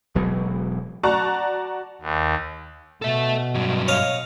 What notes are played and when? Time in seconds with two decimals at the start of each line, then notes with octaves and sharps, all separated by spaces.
0.15 E1 B2 F#3 G#3
1.03 F#4 D5 A5 A#5 C#6 F#6
2.01 D#2
3.02 B2 A4 E5
3.55 G2 F#3
3.88 C#5 D#5 F5